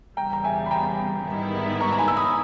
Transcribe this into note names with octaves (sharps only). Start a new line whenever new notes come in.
E2 C#3 G3 G5 A#5
A#5
E5 G#5
B5
G5 A#5
G#2 D#3 G3 B3 E4
A#5 C#6
A#5
G#5 B5
E6
B5 D#6